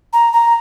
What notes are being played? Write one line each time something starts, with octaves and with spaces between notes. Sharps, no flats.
A#5
A#5